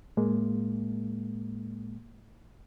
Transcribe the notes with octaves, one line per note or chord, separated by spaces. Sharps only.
A2 G#3 A#3